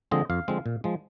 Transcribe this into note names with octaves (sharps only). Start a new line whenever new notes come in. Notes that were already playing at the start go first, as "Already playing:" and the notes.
D3 F3 G#3 C4 D#5
F2 F5
D3 F3 G#3 C4
A#2
F3 G#3